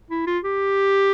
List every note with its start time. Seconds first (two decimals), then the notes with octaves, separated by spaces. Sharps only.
0.10 E4
0.27 F4
0.44 G4